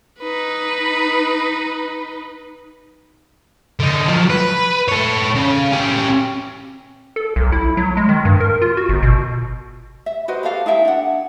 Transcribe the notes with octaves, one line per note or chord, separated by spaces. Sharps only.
D#4 B4
D3 D#4
F3 F#3
B4
A4 C#5
C#3
C#4 G4
A4
B1
E4
F#3
G#3
D#3
G2
A#4
F4
F#4
G1
B2
E5
F#4 B4 C5 D#5
G4 A4 F5
D#4 E4 E5 G5
D4 F#5